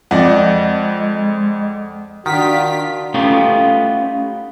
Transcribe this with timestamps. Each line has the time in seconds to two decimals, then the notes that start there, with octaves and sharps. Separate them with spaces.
0.11 F2 G#3 D5 D#5 F#5
2.26 D#3 D4 F4 F#4 B6
3.14 A3 B3 C#4 D#4 F4 G4